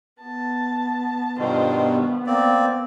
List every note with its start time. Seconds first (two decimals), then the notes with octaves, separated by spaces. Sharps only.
0.22 B3 A5
1.38 G2 B2 D#3 F4 C5
1.84 B3
2.27 A#3 C4 D5